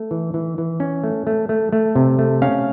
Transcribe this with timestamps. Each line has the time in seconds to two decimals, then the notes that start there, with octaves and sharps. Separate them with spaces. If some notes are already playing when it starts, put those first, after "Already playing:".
Already playing: A3
0.11 E3
0.34 E3
0.58 E3
0.80 C#4
1.04 A3
1.27 A3
1.49 A3
1.73 A3
1.95 C3
2.19 A3
2.42 C#4 F5